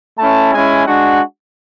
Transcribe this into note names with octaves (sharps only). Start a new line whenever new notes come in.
A3 C#4 E4 A5
G#3 C#4 E4 G#5
G#3 D4 F#4 F#5